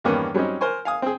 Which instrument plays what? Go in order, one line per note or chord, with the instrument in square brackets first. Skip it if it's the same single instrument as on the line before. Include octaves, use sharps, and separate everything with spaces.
[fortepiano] E2 G2 D#3 A#3 B3 C#4
F#3 G3 C4 C#4 D#4
A#4 C5 G#5 C#6
F5 G#5 D#6
C4 G#4